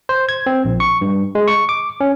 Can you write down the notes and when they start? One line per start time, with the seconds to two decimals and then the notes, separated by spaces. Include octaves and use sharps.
0.09 C5
0.29 G#6
0.46 C4
0.65 A#1
0.80 C#6
1.01 G2
1.35 G#3
1.48 C#6
1.69 D6
2.01 C#4